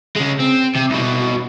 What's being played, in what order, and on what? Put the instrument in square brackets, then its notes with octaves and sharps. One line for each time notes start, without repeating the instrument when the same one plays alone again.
[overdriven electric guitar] C#3 G#3
C4
C3
C2 B2